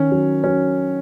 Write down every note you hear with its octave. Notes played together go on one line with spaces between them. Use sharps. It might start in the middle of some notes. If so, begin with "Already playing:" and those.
Already playing: D#3 C#4
F#3
F#3 C#4